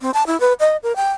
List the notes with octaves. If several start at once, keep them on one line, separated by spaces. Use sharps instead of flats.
C4
A5
E4
B4
D#5
A#4
G5